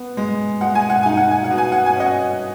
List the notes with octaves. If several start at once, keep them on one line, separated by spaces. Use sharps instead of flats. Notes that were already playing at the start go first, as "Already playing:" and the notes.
Already playing: B3
G#3
G#3 F#5
G#5
F#5
D#4 G#5
F#5
G#5
F#5
B2
G#5
F#5
G#5
C#4 D#5 F#5